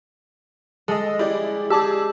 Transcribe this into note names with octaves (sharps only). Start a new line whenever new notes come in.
G#3 A4 D#5
E4 G4 D5
G4 G#4 D5 A5 D6 E6